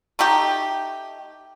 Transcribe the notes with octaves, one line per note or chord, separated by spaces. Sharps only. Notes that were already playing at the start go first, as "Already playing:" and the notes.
A3 D#4 G4